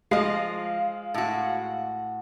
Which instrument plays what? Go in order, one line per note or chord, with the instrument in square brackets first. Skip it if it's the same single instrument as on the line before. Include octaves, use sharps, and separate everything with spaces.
[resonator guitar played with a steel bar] F3 D#5 [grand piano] G#3 [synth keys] F5
[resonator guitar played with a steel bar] A2 F#4